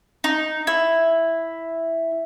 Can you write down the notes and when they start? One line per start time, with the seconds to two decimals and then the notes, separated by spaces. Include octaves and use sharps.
0.24 D#4
0.67 E4